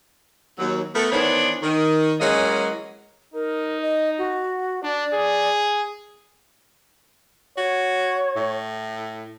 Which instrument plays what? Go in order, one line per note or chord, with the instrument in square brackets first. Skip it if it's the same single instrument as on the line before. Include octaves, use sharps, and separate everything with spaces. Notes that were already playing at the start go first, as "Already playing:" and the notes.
[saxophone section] D#2 F#3
A3 B3 A#4
D#3 E3 B3 D4 C5 C#5
D#3
E3 F#3 G#3 A#3 C#4 D#5
[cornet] D#4 [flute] A#4
[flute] D#5
F#4
[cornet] D4 [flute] D5
[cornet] G#4
[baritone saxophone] F#4 [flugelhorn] C#5
[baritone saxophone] A2